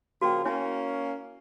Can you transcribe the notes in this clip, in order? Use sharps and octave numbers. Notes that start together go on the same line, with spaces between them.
C#3 F3 A#3 F#4 G5
A#3 C#4 E4 C#5 G#5